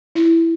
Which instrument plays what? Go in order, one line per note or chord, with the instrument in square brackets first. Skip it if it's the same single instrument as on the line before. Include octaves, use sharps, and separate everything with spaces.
[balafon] E4